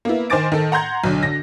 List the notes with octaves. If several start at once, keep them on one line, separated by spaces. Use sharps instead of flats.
A#3 B3 E4
D#3 C5 G#5 D6 A6 D7
D#3 A4
F#5 A#5 C6 G6 G#6
B1 D3
D3 A#6